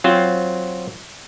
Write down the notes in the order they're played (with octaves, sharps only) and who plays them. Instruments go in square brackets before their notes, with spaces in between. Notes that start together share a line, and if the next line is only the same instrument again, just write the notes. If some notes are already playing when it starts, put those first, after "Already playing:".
[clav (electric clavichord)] F#3 C4 F4 C5